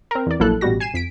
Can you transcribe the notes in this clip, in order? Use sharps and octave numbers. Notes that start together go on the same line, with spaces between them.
C4 A#4
E2 D5
A#1 F#3 A#3 E4 A4 F#6
A1 B2 G3 F#4 A#6
G#5 C7 D#7 E7
F2 B6 D7